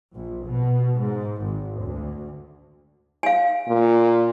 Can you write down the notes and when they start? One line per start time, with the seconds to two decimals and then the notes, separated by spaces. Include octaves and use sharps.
0.15 A#1
0.49 B2
0.99 G#2
1.44 G#1
1.85 D2
3.23 F5 G#5
3.68 A#2